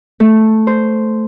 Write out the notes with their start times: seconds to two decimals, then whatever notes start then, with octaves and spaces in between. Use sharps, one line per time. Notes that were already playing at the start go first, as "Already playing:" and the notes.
0.20 A3
0.67 C5